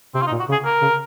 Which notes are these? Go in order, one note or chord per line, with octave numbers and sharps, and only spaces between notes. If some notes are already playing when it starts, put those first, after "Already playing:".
C3 C4
F4
D#4
A#2
F#4
C#3
G#4
A#4
C#3